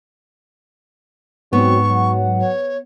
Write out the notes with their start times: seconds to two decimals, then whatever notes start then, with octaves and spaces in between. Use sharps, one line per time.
1.53 G#2 F#3 B3 C4 C#6
1.87 F#3 F#5
2.40 C#5